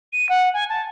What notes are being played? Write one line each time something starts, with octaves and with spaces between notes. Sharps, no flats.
D#7
F#5
G#5
A5